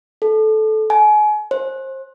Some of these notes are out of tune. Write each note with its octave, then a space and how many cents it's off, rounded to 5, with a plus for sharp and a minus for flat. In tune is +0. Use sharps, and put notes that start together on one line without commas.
A4 -15
G#5 +30
C5 +30